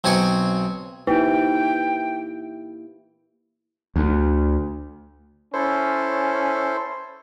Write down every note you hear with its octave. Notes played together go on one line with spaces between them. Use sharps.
B1 C4 D#4 G#5 C#6
A#3 D#4 E4 G4 B4 G5
D2
C#4 E4 A4 C5